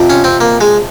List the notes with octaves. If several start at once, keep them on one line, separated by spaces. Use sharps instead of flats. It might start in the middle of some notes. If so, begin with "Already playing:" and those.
Already playing: F2 C3 F3
C#4
C4
A#3
G#3